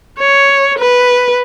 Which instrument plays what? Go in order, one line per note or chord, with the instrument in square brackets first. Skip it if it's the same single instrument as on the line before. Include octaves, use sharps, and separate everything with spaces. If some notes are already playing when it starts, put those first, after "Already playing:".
[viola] C#5
B4